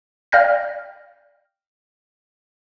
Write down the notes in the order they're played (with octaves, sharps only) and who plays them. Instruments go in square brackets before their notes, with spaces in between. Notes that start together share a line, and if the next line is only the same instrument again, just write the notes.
[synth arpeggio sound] D5 F5 G5 F6 G6 A#6